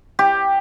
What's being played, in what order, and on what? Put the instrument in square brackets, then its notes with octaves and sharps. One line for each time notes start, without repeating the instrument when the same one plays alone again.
[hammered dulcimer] G4